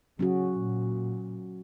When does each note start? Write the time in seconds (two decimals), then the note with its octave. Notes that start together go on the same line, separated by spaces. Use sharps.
0.19 C#3 F#3 C#4 F#4
0.59 A#2